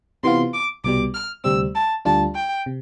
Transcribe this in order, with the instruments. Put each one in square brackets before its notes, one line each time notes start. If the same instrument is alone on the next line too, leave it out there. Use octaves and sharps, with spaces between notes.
[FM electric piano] C3 E3 B3 F4 [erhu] C6
[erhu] D6
[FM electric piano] C2 B2 G3 [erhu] D6
[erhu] F6
[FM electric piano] D2 C3 G3 C4 [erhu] E6
[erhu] A5
[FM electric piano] D2 D3 G3 D4 F4 [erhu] A5
[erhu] G5
[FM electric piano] C3